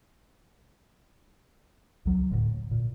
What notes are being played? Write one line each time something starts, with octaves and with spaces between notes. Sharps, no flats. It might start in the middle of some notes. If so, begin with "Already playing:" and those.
C#2 F#3
D2 A2
A#2